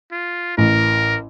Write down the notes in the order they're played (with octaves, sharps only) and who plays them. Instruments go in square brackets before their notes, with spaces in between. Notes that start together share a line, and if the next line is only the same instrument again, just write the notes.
[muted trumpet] F4
[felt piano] A1 [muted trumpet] A#4